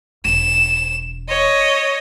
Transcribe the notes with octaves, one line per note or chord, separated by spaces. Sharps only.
E1 E7
C#5 D#5